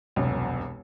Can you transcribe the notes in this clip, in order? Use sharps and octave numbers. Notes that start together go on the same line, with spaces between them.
E1 C2 F#2